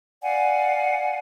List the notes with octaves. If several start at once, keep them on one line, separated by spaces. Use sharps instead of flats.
D5 F5 F#5 G#5